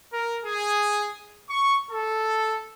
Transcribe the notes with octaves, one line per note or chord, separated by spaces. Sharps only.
A#4
G#4
C#6
A4